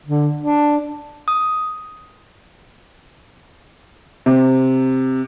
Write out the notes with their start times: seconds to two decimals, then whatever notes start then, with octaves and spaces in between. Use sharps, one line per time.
0.06 D3
0.38 D4
1.28 D#6
4.26 C3